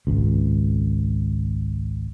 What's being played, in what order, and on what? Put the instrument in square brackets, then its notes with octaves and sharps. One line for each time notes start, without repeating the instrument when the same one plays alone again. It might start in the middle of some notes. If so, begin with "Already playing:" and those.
[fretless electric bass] G#1 C#2